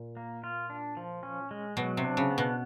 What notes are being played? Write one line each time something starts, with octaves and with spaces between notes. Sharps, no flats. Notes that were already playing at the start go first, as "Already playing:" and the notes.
Already playing: A#2
A#3
F4
D4
F3
C#4
G#3
B2 F#3
C3
D4
C#3
B3
B2